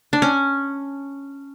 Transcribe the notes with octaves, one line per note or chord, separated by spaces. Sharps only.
D4
C#4